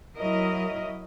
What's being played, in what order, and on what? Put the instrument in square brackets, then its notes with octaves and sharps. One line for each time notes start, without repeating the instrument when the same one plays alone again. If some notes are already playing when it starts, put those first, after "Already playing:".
[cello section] F#3 E4 A#4 D#5